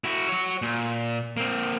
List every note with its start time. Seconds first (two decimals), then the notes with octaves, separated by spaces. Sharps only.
0.04 E4 F#4
0.29 F#4 C#5
0.62 A#2
1.37 A#3 C4